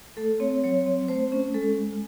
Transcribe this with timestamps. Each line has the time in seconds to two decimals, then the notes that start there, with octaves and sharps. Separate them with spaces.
0.17 A3 A4
0.40 C4 C#5
0.64 F#3 C#5
0.86 C4
1.08 A3 C5
1.32 C#4
1.54 G#3 A4